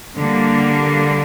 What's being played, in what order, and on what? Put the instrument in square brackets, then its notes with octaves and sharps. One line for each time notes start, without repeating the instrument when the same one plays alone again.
[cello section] D3 G3 A#3